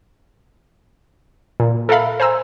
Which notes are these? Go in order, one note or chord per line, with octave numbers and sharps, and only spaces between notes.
A#2
A4 A#4 E5 F5 B5
C5 G#5 A#5 E6